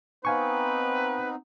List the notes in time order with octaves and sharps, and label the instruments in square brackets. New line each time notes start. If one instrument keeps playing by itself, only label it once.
[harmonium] B3 C4 D#4 [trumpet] B4 [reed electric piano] F5 G#5 C#6